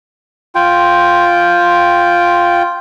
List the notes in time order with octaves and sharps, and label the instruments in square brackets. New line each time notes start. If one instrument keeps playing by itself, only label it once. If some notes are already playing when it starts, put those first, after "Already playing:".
[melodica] F4 G5